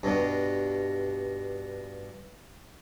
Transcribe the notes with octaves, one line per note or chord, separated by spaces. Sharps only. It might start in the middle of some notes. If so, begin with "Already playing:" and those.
G2 B2